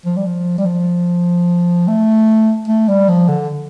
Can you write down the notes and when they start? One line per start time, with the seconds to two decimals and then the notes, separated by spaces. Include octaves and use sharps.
0.06 F3
0.16 G3
0.26 F3
0.58 G3
0.65 F3
1.88 A3
2.68 A3
2.88 G3
3.08 F3
3.28 D3